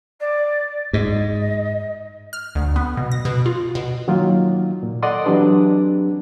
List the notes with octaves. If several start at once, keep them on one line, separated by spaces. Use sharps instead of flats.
D5
G#2 D#5
F6
D2
B3
B2
A#6
B2
F4
B2
D#3 F#3 A#3 D#4 F4
A#2
A4 D5 D#5 F#5 C6 D#6
E3 F#3 C4 D4 G4 B4